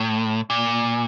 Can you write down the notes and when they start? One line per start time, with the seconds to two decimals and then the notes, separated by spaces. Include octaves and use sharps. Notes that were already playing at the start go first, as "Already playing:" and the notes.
Already playing: A2
0.50 A#2